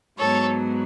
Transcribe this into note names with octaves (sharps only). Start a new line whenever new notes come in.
G#2 F#3 B3 A4 C#5